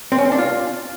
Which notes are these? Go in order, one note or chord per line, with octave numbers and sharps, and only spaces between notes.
C4
C#4
C4
D4
F4